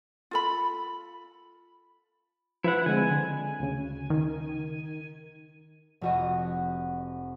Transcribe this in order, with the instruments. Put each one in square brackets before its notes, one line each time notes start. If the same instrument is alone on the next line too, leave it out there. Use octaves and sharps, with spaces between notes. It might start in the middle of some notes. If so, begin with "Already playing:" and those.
[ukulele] F4 A4 B5
[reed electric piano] F3 B4 [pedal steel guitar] E4 F#5
[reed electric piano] D3 G#3 C4 [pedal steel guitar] G#5
[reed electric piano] D3
D2 C#3
[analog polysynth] D#3
[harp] F1 F#4 D#5